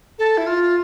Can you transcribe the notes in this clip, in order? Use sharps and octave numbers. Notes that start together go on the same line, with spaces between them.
A4
E4
F4